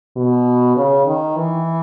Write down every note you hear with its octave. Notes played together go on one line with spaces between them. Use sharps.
B2
C#3
D#3
E3